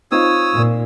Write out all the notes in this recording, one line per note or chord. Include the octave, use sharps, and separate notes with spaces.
C4 D#4 F4 C#5 D#6 E6
A#2